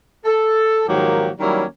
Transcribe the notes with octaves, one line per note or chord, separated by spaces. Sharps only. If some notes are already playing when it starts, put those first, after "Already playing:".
A4
G#2 D#3 F3 F#3 A#3 G4
D#3 F#3 G3 A#3 C#4 E4